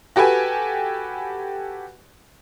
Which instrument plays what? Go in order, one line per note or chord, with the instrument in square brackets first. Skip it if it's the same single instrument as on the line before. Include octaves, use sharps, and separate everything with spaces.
[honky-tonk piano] F#4 G4 A4 B4 G#5